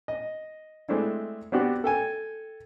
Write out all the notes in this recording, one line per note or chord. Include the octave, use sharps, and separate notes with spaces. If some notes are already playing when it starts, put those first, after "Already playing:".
D#5
G#3 A3 C4 D4 E4
B3 C4 D4 F#4 G4
A4 G5 G#5